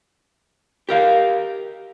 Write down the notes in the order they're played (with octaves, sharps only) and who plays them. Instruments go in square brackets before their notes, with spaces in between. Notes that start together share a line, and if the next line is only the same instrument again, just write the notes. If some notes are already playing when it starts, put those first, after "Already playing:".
[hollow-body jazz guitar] G4 A#4 F5